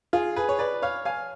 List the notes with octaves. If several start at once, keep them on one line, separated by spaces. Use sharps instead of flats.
F4 G#4
G#4 B4
C#5
B4 D5
C#5 F5
F5 G#5